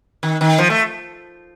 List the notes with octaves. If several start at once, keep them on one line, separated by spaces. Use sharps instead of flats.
D#3
D#3
F3
A3